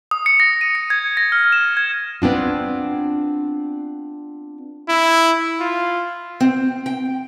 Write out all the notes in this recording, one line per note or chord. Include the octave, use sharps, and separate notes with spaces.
D#6
C#7
A#6
D#7
C#7
G#6
A#6
F6
E7
G#6
B3 C4 D4 F4
E4
F4
C4
G5